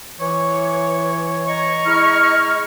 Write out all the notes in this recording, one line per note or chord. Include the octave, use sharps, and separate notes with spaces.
E3 C#5
D#5 A#5 C#6
G#3 E4 F6